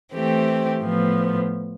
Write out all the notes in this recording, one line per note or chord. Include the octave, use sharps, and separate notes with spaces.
E3 A3 C4 G4
A2 F3 B3